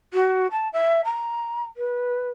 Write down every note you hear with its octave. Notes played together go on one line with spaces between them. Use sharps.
F#4
A5
E5
A#5
B4